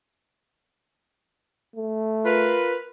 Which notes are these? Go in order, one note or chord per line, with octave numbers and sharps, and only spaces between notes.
A3
F4 A#4 B4